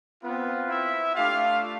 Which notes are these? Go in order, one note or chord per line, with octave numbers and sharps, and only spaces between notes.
B3 C4 F4 B4
E4 E5
A3 D4 F4 G4 F5